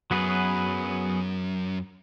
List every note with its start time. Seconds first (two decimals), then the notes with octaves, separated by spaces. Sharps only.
0.11 F#2 F#3 B3 G#4 B4